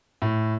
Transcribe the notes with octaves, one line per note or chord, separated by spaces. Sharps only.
A2